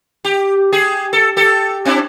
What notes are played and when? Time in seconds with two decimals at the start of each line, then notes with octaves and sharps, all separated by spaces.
0.25 G4
0.72 G4 G#4
1.13 A4
1.37 G4 A4
1.85 C4 D4 E4